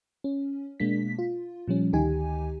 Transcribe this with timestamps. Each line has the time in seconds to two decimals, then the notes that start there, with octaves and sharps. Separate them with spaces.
0.24 C#4
0.80 B2 G#3 A#3 D4 B6
1.19 F4
1.68 A#2 F3 G3 C#4
1.93 D2 D#3 D#4 G4 G#5